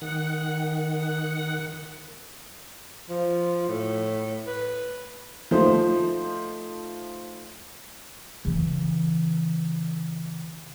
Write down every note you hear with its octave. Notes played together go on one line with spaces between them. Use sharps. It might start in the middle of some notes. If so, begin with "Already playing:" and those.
D#3 F#5
F3
A2
B4
F3 A3 D#4 C5
C#3 E3